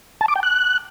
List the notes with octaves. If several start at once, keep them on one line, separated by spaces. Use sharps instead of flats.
A5
D6
G5
F#6